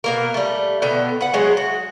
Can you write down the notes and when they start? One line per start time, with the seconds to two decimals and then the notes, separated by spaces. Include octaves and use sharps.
0.04 B2 A#3 A#4
0.34 G3 A3
0.82 B2 D3 B3 G5
1.21 B4 F#5
1.33 F#3 G#3 A3 G#4
1.57 F#4